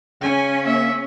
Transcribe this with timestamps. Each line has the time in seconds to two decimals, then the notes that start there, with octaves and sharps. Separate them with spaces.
0.22 C#3 C#4 G#5
0.66 A#3 E5